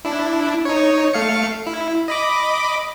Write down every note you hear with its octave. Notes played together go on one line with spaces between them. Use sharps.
D4 E4
D#4 C#5
A3 F5 C#7
E4
D#5 B5 D6